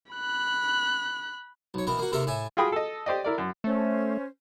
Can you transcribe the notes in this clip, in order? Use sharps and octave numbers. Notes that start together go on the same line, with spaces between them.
B5 F#6
B1 C#5
B2 E3 A#4
A#3 F#4
D#2 C3 A4 A#4 E5 C6
A2 E5 G#5 A5
F4 F#4 G#4 G5 B5 D#6
A4 D#5
G4 C5 D5 D#5
E4 A#4 D5
F#2
A3 C#4 C5